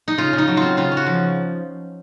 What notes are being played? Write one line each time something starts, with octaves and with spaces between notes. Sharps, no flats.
D#4
C#3 F4
C#3
D#4
F#3
C4 F4
C#3 F4
C#4
F#4
F3